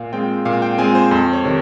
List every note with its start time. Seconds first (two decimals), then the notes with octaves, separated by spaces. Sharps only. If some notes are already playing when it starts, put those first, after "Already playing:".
Already playing: A#2 F5
0.12 G#3 C4 F4 G5
0.45 A#2 F5
0.62 G5
0.78 G#3 C4 F4 G#5
0.95 C5
1.11 F2 C5
1.33 C#5
1.44 C3 D#3